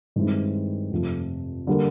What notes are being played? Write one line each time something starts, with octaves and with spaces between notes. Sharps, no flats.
G2 D#3 G#3 C4 E4
F2 C3 F3 A3
D3 G3 A#3